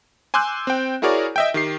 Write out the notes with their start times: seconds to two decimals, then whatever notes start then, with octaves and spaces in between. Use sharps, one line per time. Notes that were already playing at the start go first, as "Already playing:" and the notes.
0.34 G#5 C6 D6 E6 F#6 G6
0.67 C4 G5
1.02 E4 F#4 G#4 A#4 C#5 D5
1.36 D#5 E5 G5
1.54 D#3 G4 C7